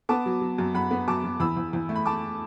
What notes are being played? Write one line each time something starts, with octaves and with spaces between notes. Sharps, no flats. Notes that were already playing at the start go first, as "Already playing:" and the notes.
B3 A5 D6
F#3
F#3
F#2
F#2 F#5 B5
B3
F#2 A5 D6
F#2
E2 B5 E6
E2
E2
A3
B5
A3 A5 D6